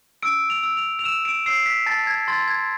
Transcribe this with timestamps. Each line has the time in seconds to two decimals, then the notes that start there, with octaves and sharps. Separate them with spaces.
0.23 E6 D7
0.50 F7
0.63 E6
0.77 F7
0.99 F7
1.04 E6 E7
1.25 D7
1.46 E6 C7
1.66 B6
1.86 A5 A6
2.07 G#6
2.28 C6 A6
2.48 G#6